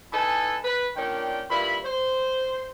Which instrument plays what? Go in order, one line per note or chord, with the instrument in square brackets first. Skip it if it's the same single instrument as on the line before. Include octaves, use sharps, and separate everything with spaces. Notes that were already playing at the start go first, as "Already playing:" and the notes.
[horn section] D#4 E4 A4 B4 G#5 A5
B4
A#2 D#3 C#4 D4 G5
G2 A#2 E4 B5
C5